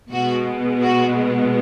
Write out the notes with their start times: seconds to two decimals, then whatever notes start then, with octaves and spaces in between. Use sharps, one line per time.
0.11 B2 G#3 B3 F#4
0.81 F#4